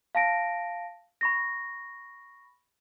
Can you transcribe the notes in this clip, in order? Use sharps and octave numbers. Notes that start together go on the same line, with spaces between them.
F5 A5 A#6 D7
B5 C#6 A#6